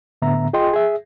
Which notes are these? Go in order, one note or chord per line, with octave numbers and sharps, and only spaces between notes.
A2 D3 B3 E5 A#5
F4 G#4 D#5 G5 C6
G#4 E5